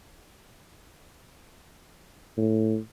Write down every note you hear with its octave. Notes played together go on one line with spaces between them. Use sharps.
A2